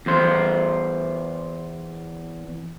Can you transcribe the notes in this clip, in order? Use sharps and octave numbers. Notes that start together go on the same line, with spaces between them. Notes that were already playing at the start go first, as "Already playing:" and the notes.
E2 C5